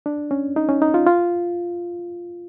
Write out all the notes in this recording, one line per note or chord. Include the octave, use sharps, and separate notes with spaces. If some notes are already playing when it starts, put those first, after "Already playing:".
D4
C#4
D#4
C#4
D#4
F4
F4